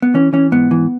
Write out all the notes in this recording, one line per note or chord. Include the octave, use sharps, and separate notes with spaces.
B3
E3 C#4
E3 C#4
G#2 B3
E3